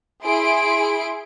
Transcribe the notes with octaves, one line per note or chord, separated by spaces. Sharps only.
E4 G#4 C6 D7